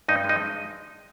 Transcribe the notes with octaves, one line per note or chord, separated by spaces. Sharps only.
G2 D#4 D#5
G#3
D#4 D#5